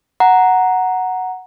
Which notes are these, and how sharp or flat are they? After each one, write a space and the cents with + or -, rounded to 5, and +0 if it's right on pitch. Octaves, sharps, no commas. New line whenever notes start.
F#5 +0 A#5 +0